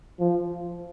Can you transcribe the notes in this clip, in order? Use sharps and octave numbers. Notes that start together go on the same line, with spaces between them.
F3